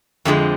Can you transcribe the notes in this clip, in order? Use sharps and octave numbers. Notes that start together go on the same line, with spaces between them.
F2 D3 F3 G#3